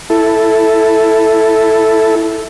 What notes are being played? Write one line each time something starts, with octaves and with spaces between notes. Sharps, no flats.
E4 A4